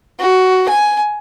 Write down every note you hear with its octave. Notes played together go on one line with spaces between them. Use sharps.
F#4
G#5